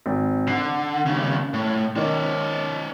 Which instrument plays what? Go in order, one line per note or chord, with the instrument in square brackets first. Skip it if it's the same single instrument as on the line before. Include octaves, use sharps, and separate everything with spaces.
[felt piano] G#1
[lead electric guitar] D3 [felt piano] C7
[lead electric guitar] D#2 C#3
A2
[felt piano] D#3 [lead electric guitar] C#4 D5